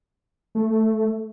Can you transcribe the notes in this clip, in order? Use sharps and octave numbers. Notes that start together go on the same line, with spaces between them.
A3